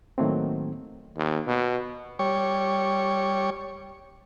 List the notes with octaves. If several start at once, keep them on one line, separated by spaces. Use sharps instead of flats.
A2 D#3 F#3 A3 A#3 C4
D#2
B2
G3 C#5